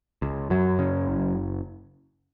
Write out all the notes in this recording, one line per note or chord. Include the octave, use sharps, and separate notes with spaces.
C#2
F#2 F#3
C#3
F#1